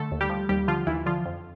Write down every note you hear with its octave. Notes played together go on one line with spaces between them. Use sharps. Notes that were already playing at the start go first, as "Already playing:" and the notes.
Already playing: D3 A3 A4
D#2
G3 G4
F3
D#2 G3 G4
D3 F3 F4
D#2 E3 E4
D3 F3 F4
F2